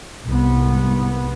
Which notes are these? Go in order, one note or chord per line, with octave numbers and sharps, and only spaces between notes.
C2 G#2 B3